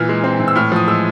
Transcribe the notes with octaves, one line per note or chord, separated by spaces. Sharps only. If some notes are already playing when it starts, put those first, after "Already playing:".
Already playing: A#2 E3 F6
G#3
C4
E3
E6
A2 F6
F3 D#6
G#3 E6